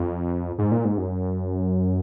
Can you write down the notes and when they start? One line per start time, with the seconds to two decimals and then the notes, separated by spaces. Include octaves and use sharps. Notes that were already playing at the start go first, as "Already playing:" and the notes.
Already playing: F2
0.58 G#2
0.71 A#2
0.85 G#2
0.98 F#2